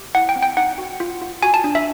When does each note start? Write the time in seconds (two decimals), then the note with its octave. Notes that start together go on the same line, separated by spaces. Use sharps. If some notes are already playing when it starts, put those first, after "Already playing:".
Already playing: G4
0.15 E4 F#5
0.29 G5
0.36 C4
0.43 G5
0.57 D#4 F#5
0.78 F#4
1.00 F4
1.22 F4
1.43 F#4 G#5
1.54 A5
1.64 D4
1.75 E5